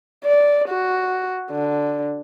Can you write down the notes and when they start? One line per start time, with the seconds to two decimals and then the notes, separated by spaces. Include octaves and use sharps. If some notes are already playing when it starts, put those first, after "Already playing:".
0.24 D5
0.69 F#4
1.51 D3